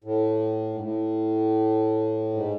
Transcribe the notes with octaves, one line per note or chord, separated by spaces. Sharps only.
A2
G#2
A2
G#2